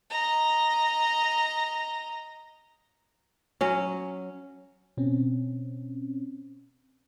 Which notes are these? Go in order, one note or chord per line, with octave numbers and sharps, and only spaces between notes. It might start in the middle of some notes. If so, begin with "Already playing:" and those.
D#5 A#5
F#3 C#4
B2 C4 C#4